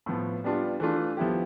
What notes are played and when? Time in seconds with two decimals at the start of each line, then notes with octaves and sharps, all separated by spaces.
0.06 A2 F3 B3
0.44 G3 B3 D4 F4
0.80 E3 A3 D4 F4
1.17 F3 B3 E4 G4